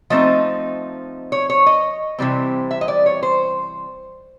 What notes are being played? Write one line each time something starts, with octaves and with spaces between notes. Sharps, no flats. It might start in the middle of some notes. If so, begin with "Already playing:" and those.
F3 A3 C4 D#4 D#5
C#5
C#5
D#5
C3 E3 G3 C4
E5
D#5
D5
C#5
C5